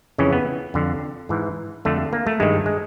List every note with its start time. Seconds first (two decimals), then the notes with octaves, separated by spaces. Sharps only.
0.18 F2 C#3 E3 C#4
0.33 B3
0.74 F2 D3
1.29 G#2 E3
1.85 F2 D3 A3
2.13 A#3
2.27 A3
2.40 G2 D#3 G#3
2.66 G#3